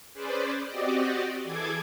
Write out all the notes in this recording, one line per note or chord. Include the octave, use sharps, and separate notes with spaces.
C#4 G#4 B4 C5 D5
C4 F#4 G4 D5 D#5
E3 G#4 A4 D6 G#6